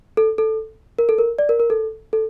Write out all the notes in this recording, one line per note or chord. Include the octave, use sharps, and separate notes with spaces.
A4
A4
A#4
A4
A#4
D5
A#4
A#4
A4
A4